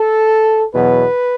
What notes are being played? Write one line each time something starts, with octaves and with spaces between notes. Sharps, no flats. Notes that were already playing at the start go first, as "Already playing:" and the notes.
Already playing: A4
E2 B2 F#3 B3 B4